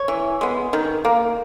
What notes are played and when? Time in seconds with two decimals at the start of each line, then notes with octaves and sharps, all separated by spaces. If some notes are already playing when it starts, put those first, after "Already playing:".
Already playing: C#5
0.08 E3
0.41 G#3 B3
0.73 D#3
1.05 A#3